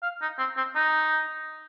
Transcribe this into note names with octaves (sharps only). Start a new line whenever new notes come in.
F5
D#4
C4
C4
D#4